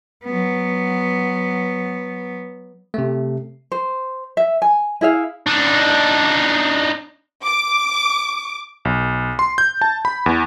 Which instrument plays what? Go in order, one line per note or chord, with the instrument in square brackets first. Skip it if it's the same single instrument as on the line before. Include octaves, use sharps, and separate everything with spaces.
[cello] F#3 B3
[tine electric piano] C3 A3
[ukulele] C5
E5
G#5
E4 G#4 E5 F5
[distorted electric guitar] D4 D#4
[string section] D6
[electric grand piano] B1
C6
G6
A5
B5
E2